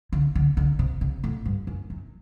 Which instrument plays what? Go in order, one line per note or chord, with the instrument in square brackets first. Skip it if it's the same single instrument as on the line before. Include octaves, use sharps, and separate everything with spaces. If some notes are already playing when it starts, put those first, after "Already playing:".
[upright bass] D3
D3
D3
C3
C3
A2
G2
F#2
F#2